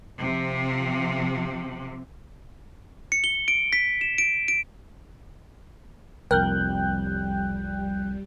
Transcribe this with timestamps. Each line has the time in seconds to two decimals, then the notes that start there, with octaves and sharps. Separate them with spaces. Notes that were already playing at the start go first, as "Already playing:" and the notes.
0.20 C3 F3
3.12 C#7
3.24 G7
3.48 D7
3.73 B6
4.01 E7
4.18 D7
4.48 D7
6.31 C2 F2 G3 A#4 G5 F#6 G6